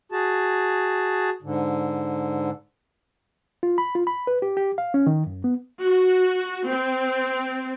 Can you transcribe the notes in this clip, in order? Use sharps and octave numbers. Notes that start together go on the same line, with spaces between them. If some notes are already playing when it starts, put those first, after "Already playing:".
F#4 G#4 A5
G#2 D3
F4
B5
F4
B5
B4
G4
G4
F5
C#4
D#3
F#2
B3
F#4
C4